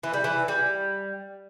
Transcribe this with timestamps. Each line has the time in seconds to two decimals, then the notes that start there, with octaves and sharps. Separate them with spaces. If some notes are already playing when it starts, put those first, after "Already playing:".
0.03 E3
0.14 G3
0.24 E3
0.48 G3